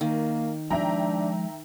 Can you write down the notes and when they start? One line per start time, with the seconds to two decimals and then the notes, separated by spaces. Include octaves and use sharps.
0.01 D#3 A#3
0.70 F3 G#3 D4 E5 G5 A#5